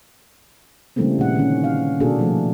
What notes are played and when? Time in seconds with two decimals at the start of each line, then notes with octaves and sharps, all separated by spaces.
0.96 C#3 E3 G3 A3 A#3 C4
1.18 A#2 D#3 F#5
1.35 D3 D#3 A3 A#3 C#4
1.64 F5
2.00 B2 A#3 D4 F#4 G#4 A4
2.19 F3 A3 A#3